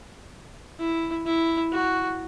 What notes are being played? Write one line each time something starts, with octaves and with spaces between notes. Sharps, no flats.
E4
E4
F#4